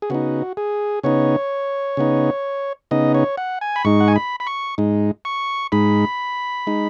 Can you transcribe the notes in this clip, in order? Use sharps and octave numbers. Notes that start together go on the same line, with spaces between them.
G#4
C#3 B3 D#4 F#4
G#4
C#3 B3 D#4 C#5
C#3 B3 D#4
C#3 B3 D#4 D#5
C#5
F#5
G#5
B5
G#2 G#3 D#4 C#6
F#5
G#5
B5
B5
C#6
G#2 G#3 D#4
C#6
G#2 G#3 D#4 B5
G#3 D#4